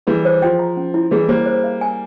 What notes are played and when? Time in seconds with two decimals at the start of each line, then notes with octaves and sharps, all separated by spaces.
0.07 E3 G3 G#4
0.25 C5
0.42 F3 G5
0.59 A#5
0.77 C#4
0.94 E4
1.11 E3 G3 G#4
1.29 G3 A#3 C5
1.46 C5
1.64 F5
1.81 G#5